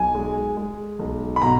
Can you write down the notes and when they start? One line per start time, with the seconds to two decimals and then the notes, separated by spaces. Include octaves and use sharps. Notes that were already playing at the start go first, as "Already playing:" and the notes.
Already playing: B1 G#5
0.15 G#3
0.57 G#3
0.99 B1
1.36 B5
1.41 B2 A#5